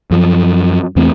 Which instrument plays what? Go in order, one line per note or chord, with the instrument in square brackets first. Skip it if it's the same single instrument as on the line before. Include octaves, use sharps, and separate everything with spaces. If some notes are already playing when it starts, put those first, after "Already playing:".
[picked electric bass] F#2 F3
E2 E3 A3 C4